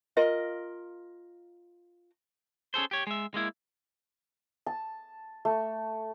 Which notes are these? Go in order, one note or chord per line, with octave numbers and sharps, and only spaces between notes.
F4 A#4 D#5
C#4 G#4 A4 C5
G4 C#5
G#3 E5
G#3 A#3 E4
A5
A3